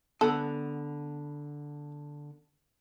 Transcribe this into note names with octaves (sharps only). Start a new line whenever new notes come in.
D3 B3 A4 F#5